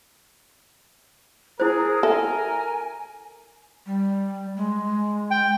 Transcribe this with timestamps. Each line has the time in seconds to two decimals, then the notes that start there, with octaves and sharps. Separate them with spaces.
1.60 E4 G#4 A#4 C5
2.03 A4 E5 G#5
3.86 G3
4.57 G#3
5.31 G5